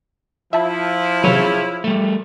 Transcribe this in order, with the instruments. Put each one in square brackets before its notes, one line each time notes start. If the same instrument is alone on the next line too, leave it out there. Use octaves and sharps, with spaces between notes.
[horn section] F3 E4 [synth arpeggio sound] E5 A5 B5
[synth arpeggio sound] C3 E3 F#3 [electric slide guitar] G#4 C#5
[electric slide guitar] G3 A3